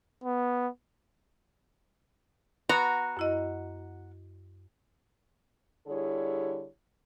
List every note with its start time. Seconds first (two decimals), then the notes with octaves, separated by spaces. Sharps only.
0.24 B3
2.69 B3 F#4 A#5
3.17 F#2 E4 D#5
5.87 D3 G3 E4 G#4 C#5